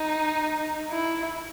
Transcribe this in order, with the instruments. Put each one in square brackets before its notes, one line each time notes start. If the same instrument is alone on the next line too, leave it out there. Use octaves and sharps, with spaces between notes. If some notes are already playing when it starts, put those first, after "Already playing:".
Already playing: [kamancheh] D#4
E4